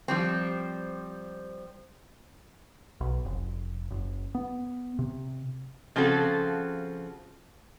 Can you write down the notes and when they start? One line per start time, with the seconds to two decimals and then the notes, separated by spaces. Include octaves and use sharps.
0.08 F3 G3 C4
3.01 B1
3.25 F1
3.91 F#1
4.35 B3
4.99 C3
5.96 C#3 F3 C4 F#4 A4